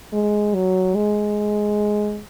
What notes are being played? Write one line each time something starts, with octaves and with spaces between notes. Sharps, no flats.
G#3
F#3
G#3